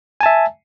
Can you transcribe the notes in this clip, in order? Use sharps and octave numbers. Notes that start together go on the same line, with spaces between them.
E5 G#5 A5